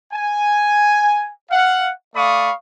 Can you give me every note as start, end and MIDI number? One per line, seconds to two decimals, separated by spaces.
0.13 1.29 80
1.50 1.90 77
1.50 1.90 78
2.15 2.51 57
2.15 2.51 74
2.15 2.51 77
2.15 2.51 83
2.15 2.51 85
2.15 2.51 87